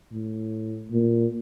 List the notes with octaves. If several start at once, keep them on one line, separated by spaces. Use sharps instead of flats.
A2
A#2